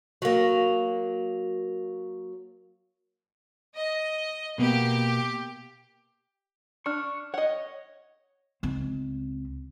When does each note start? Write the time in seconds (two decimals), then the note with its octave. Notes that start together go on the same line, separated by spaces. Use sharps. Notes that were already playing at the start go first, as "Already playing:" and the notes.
0.22 F#3 A#3
3.75 D#5
4.58 B2 A#3 B3 G4
6.86 D4 C#6 F6
7.34 C#5 D#5 F#5
8.63 C#2 C4